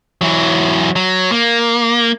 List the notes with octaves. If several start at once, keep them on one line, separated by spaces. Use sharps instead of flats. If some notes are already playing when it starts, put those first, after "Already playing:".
E3 F#3
F#3
A#3